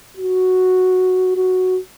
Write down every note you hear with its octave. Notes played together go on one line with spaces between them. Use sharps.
F#4
F#4